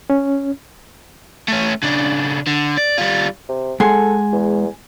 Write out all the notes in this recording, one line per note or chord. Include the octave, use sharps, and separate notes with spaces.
C#4
A3 C#4
C#3 D4
D3
D5
G3 F4
C3
G#3 A4 F#5 G#5 C6
E2